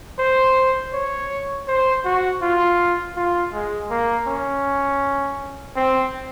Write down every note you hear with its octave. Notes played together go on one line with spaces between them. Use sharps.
C5
C#5
C5
F#4
F4
F4
G#3
A#3
C#4
C4